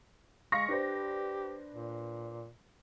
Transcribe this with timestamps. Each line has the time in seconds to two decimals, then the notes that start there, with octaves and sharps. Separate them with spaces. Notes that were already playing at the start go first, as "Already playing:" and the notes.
0.52 G#3 F5 C#6 A#6
0.69 D4 G4 B4 C5
1.70 A#2